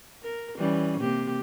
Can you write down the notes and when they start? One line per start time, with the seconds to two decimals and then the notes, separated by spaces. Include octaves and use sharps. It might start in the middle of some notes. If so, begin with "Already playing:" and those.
0.23 A#4
0.58 E3 G3 C#4
1.00 C3 A#3 G4